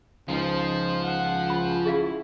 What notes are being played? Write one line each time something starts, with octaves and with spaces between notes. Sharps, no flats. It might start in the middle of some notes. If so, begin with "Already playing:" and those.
C#2 F3 D#4 C5
F#5
B5 D#6
C#4 E4 G#4 E5 F5